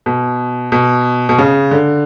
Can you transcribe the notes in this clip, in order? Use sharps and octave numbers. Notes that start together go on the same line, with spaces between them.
B2
B2
B2
C#3
D3